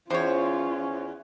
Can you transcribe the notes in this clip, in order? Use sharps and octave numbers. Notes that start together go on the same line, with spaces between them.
E2 C#4 F4 C5 C#5